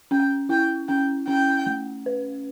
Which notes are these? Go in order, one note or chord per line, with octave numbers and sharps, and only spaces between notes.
C#4 G5
E4 G5
C#4 G5
C#4 G5
A3
B4